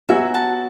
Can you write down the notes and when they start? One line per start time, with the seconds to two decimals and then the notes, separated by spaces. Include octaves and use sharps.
0.09 F#3 B3 F#4 E5 G#5
0.34 F#5 A5